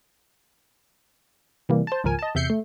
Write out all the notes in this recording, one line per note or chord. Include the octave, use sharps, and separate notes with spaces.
C3 E3 G3 A#3
C5 A5
G#1 C#2 F3 A#4 G#5
D#5 A5
E2 C3 E5 G6 C7 C#7
A3